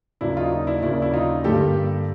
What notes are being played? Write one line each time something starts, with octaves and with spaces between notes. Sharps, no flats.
D#2 C#3 F#3 A#3 D4 E4
D#4 F4
D#4
D4 E4
D#2 C#3 F#3 A#3 D4 E4
E4
D#4 F4
G2 D3 G3 A#3 G4 A4